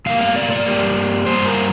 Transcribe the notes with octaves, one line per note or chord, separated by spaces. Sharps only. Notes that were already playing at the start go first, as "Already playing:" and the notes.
G2 G3 A#3 F5
F5
D5
D5
G2 G3 A#3
G2 G3 A#3 C5
A#4